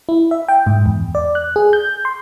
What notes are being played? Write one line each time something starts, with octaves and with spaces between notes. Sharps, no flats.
E4
E5
G5
G#2
E2
D5
F#6
G#4
G6
C6